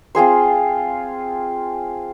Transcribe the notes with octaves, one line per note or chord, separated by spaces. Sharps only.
C4 F4 G#4 C5